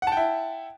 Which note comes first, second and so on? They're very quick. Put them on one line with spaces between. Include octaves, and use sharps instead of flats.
F#5 A5 G5 E4